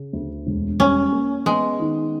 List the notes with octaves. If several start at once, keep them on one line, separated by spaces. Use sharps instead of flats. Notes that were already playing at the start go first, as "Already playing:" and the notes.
Already playing: C#3
D2
E1
G3 C#4
A#3
G#3 B3
D#3